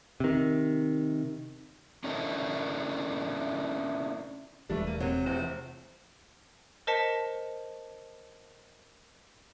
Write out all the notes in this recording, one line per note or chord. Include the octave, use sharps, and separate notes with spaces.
C3 D#3
C#4 D4 E4 A4 A#4 D#5
E1 E3 G3 A3 D4
A#3 D#7
C3 F#3
F1 E2 C5
A#4 C5 D#5 A5 B6 C#7